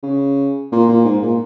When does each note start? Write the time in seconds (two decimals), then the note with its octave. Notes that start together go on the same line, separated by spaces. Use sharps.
0.03 C#3
0.72 A#2
0.89 A#2
1.05 G#2
1.23 A#2